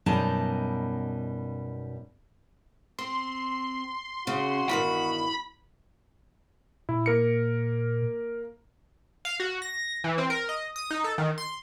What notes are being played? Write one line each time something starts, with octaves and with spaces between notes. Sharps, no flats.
F#2 B2 G3 D#4 A5 A#5
C4 C6
C#3 C#4 F#4
E2 G2 D#3 B5
A#2 E4
A#3 A#4 C#7
F5
F#4
A#6
E3
C4
A#4
D#5
D#6
D#4
A4
D#3
C6